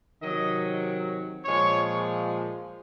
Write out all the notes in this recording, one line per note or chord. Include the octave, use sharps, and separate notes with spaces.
C3 D#3 F#3 D#5
A#2 F3 G#3 C#5